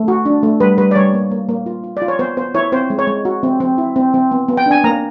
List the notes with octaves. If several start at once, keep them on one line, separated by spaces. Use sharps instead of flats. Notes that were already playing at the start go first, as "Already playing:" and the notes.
Already playing: A3
F#4
D4
A3
G3 B4
G3 B4
D5
G3 C#5
A#3
A#3
A#3
F4
F4
D5
F4
C#5
B3 C5
B3 C5
E4 C#5
C4 C5
G#3
C#5
G#3
F#4
C4
C4
E4
C4
C4
B3
B3
G5
D4 G#5
A#3 A#5